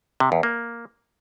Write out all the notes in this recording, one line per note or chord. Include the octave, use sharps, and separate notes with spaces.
C3
E2
A#3